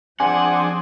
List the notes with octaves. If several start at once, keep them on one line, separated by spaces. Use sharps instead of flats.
F3 C4 D4 G#4 F#5 G#5